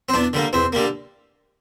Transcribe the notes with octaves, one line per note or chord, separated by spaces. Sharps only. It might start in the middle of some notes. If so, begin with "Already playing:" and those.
C4
E2 D4
D3 G3 A#3
E2 C4
D3 G3 A#3